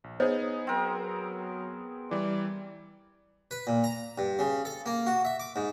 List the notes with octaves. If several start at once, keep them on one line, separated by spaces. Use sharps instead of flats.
A#1
B3 D#4 G#4 C5 C#5 D#5
F#3 C4 A#4
E3 G3 D5
B4
A#2
A#5
G2
C#3
A4
A#3
F#4
E5
D6
G#2